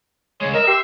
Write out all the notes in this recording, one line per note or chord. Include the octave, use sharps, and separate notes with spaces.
C#3 G#3 C#5
A#4 D#5 E5 A#5
G4 C6 E6